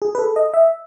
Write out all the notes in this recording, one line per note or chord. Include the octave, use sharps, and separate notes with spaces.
G#4
B4
A4
D#5
E5